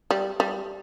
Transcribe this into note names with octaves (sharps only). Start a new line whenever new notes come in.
G3
G3